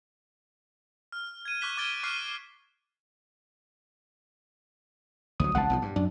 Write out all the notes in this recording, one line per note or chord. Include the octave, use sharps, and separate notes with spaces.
F6
G#6 D#7
C#6 D6 F#6 B6 E7 G7
D6 F6 G#6 A6 D7 G7
C#6 D6 F6 F#6 C7 D#7
D2 F#3 D#6
G#1 C#2 B2 F#5 A5
B1 E3 F3
G2
F#2 D4